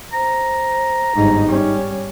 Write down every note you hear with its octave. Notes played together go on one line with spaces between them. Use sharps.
C5 A#5
G1 G#2 D#4
G3 C#4